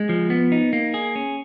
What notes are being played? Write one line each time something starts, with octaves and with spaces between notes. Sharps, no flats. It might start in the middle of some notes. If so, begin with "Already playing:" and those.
Already playing: G#3
F3
B3
D#4
A#3
G#4
C#4